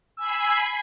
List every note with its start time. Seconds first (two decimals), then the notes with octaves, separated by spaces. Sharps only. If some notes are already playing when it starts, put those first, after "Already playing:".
0.17 G#5 B5 E6 C7